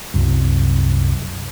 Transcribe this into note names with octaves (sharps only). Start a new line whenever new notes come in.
C2 F#2